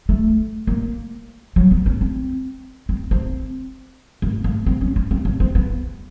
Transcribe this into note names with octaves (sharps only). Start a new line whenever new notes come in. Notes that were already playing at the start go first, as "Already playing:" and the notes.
A3
A#3
F#3
B3
C#4
C4
C4
C4
A#3
A#3
C4
C#4
C#4
C4
C#4
C4
B3